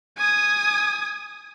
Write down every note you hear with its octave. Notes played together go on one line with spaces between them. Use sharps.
G#5 D#6